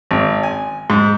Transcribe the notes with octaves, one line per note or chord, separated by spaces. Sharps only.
G#1
G#5
G#2